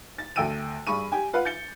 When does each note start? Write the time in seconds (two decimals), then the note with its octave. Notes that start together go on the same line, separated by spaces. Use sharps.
0.18 A6
0.36 D2 A3 G5 E6 D7 D#7
0.87 G2 G#4 B5 C#6 D#7
1.12 G4 G5 G#5
1.33 F4 B4 F5 F#5
1.45 G6 A6 C#7 G7